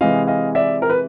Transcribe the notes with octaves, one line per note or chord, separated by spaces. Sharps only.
C3 E3 G#3 D#5 F5
D#5 F5
D5 E5
A#4
B4